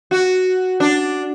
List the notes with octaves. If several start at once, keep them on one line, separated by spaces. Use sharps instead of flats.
F#4
D4